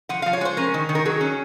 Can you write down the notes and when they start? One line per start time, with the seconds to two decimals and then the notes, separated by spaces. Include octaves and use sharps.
0.09 F3 F#5
0.22 F3 F5
0.33 C#5
0.41 G#3 C5
0.57 C#4 A#4
0.74 D#3
0.89 D#3
0.95 A#4
1.06 F#3 G#4
1.21 C#4